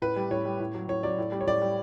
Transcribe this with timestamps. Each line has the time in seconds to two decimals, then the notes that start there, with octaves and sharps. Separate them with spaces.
0.02 A2 B4
0.16 G3
0.31 A2 C#5
0.45 G3
0.60 A2
0.75 F#3
0.89 A2 C#5
1.03 F#3 D5
1.18 A2
1.32 G3
1.41 C#5
1.47 A2 D5
1.62 G3